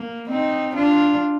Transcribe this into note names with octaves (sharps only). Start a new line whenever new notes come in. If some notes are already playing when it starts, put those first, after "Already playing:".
Already playing: A#3
C4 D#4
D4 F4